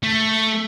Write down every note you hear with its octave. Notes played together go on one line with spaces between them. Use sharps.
A3